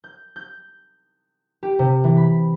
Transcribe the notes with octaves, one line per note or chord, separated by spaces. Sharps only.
G6
G6
G4
C3
E3
B5